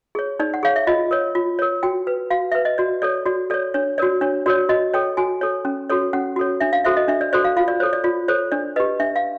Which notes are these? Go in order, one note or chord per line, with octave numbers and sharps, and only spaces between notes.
G#4 C#5
D#4 D5
F#5
G#4 C#5 F5
E5
F4 D#5
A#4 C#5
F4
A#4 C#5
F#4 G5
B4
F#4 F5
B4 E5
D#5
F#4 D5
A4 C#5 D5
F#4 D5
A4 C#5 D5
D4 C#5
F#4 A#4 C#5 D5
D4 C#5
F#4 A#4 C#5 D5
F#4 D#5
A4 C#5 G5
F#4 G#5
A4 C#5
C#4
F#4 A4 C#5
C#4 F#5
F#4 A4 C#5
D4 E5
F5
F#4 A4 C5 E5
D#5
D4 E5
D5
F#4 A4 C5 D5
F5
F4 F5
D5
A4 C5 C#5
D5
F4 D5
A4 C5 C#5
D4 D5
G4 B4 D#5
D4 E5
F5